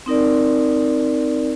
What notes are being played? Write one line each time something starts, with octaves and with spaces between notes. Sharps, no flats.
C4 D#4 A#4 D5